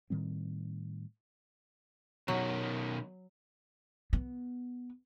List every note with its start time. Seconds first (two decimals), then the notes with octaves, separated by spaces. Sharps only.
0.10 A2 D#3 G3 C4
2.28 B2 D#3 F#3
4.13 B3